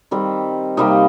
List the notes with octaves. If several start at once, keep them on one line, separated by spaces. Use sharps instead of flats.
D#3 G3 C4
C3 D#3 G3 A#3 D#4 D#5